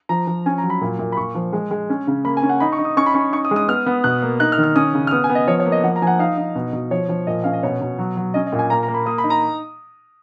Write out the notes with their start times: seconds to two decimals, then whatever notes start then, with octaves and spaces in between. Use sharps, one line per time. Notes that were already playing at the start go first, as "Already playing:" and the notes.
0.09 F3 A#5
0.27 F3
0.46 C#4 G#5
0.58 A#5
0.63 F#3
0.70 B5
0.81 A#2
0.99 A#2
1.12 B5
1.17 A#2 C#6
1.35 F3
1.53 G#3
1.71 G#3
1.90 C#4
2.07 C#3
2.25 A#3 B5
2.37 G#5
2.43 C#4
2.49 F#5
2.60 D#4 B5
2.72 C#6
2.79 D#4
2.85 D#6
2.97 C#4 C#6
3.06 B5
3.14 C#4 C#6
3.32 D#4 C#6
3.45 D#6
3.51 G#3
3.56 D#6
3.68 B3 F6
3.86 B3
4.04 B2 F#6
4.22 A#3
4.40 D#4 F#6
4.52 F6
4.58 D#3
4.63 F6
4.76 C#4 D#6
4.94 C#3
5.07 F6
5.11 B3 D#6
5.24 G#5
5.29 B3
5.35 D#5
5.47 F3 C#5
5.60 C#5
5.66 A#3
5.72 D#5
5.84 F3 F#5
5.96 A#5
6.02 F3 G#5
6.07 F#5
6.19 D#4 F5
6.37 D#4
6.55 B2
6.73 B2
6.91 F3 C#5
7.09 F3
7.27 A#2 D#5
7.44 C#4 F5
7.53 D#5
7.63 B2 C#5
7.81 B2
7.98 F#3
8.17 F#3
8.34 C#4 D#5
8.47 D#5
8.52 A#2
8.59 G#5
8.70 A#3 A#5
8.83 A#5
8.88 A#3
8.94 B5
9.06 A#3 D#6
9.18 B5
9.24 D#4
9.30 A#5